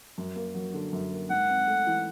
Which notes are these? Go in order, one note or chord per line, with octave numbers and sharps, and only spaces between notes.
F#2
A#3
F#3
D3
F#2
A#3
G#2 F#5
C4
A3
E3